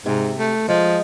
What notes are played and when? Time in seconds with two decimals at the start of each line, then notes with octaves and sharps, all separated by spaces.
0.06 G#2 C3
0.39 A3
0.68 F3 G#3